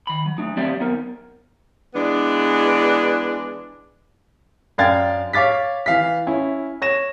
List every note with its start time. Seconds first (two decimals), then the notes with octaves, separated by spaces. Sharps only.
0.07 D#3 B5
0.26 F#3
0.38 A3 D4 D#4
0.57 F#3 C4 G4 D5 E5 F5
0.80 B3 D#4 A#4
1.95 E3 G#3 B3 D4
4.78 F#2 D4 F5 G5 G#6 A6
5.33 C#5 F5 D6 A6 B6
5.86 E3 F5 B6
6.27 C#4 E4
6.82 C#5 A#6 E7